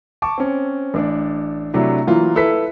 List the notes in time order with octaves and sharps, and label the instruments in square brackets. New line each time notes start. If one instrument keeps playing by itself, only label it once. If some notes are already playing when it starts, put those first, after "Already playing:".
[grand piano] A5 C#6 D6
C4 C#4
A1 D4 D5
C3 F#3 A3 D4 E4
E3 F#3 A#3 F4
E4 A4 B4 B6